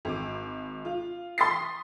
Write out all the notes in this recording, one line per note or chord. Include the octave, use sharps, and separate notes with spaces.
G#1 D6
F4
C6 C#6 D#6 A6 B6 C7